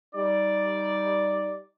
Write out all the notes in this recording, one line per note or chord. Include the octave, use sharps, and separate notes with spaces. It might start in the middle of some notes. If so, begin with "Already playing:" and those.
G3 D#4 D5